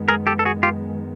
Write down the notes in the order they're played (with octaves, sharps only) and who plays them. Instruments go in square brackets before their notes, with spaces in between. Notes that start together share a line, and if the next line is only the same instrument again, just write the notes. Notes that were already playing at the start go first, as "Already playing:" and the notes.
Already playing: [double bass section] F#2 D#3 G#3 B3
[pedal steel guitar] G#4 A#4
G4 A4
A4
F#4 G#4
F4 G4